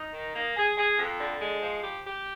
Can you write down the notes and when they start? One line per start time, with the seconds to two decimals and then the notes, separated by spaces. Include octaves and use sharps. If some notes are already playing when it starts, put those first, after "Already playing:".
Already playing: D#4
0.14 D#3
0.35 A#3
0.57 G#4
0.78 G#4
0.99 F2
1.20 D3
1.41 G#3
1.62 F3
1.83 G4
2.04 G4